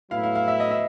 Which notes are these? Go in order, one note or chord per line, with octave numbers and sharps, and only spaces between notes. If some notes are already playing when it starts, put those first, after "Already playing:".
A2 F#3 B3 E4 F5
F5
F5
E5
D#5
E5